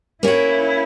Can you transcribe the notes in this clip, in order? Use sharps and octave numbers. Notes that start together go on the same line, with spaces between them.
A#3 C#4 E4 F#4